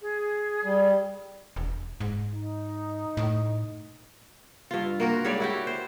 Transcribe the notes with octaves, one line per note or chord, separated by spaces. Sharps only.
G#4
G3
E1
G#2
D#4
A2
G2 F4
A#3 F#4 A#4
G#2 G3 C#5 D5
E4 F#4 G4
C5